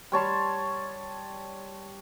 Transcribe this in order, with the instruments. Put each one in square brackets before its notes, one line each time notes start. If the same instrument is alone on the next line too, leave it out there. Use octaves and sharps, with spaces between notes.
[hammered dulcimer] G3 C#5 A5 C6